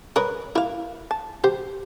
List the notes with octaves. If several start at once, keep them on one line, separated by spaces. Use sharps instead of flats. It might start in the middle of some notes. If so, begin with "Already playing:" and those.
A#4 B4 C#5 D#6
A#3 E4 F5
A5
G4 C5